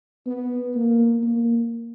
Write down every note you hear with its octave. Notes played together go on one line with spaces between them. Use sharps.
B3
A#3
A#3